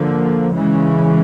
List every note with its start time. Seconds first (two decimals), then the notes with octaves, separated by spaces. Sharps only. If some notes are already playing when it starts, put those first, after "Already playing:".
Already playing: D3 F3 A#3
0.54 C#3 E3 G#3 C#4